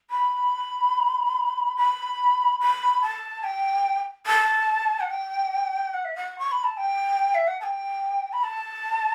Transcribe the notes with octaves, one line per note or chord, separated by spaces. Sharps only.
B5
B5
B5
A5
G5
A5
F#5
G5
F#5
E5
F#5
C#6
B5
A5
G5
E5
F#5
A5
G5
B5
A5